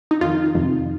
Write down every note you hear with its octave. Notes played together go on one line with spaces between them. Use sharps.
D#4
F2 D#3 F4
F2 C3 D#3